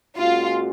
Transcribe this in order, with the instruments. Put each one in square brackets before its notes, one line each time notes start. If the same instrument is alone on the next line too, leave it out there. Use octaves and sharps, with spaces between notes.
[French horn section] A#2 G#3 C#4 F#4 [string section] F4